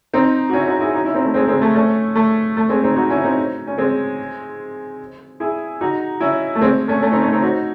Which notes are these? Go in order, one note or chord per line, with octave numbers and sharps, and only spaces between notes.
C4 D#4
F#4
C#4 E4
D#4 F#4
E4 G#4
D#4 F#4
C#4 E4
C4 D#4
A3
G#3 C4
G#3 C4
A3
A3 C#4
A3
A3
G#3 C4
C4 D#4
D#4 F#4
C#4 E4
C4 D#4
C#4
G#3 C4
E4 G#4
D#4 F#4
C#4 E4
A3
G#3 C4
A3 C#4
A3 C#4
C4 D#4
A3 C#4
C4 D#4
D#4 F#4